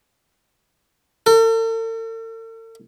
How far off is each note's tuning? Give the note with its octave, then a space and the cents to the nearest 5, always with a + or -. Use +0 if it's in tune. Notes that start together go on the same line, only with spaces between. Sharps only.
A4 +45